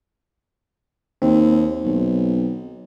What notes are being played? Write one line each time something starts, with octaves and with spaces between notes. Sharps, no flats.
D#2 C4
B1